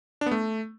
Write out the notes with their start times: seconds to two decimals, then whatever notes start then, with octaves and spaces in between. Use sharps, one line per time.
0.21 D4
0.26 B3
0.31 A3